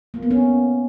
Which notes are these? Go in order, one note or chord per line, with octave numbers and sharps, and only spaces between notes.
A#3
B3
A#3 C#4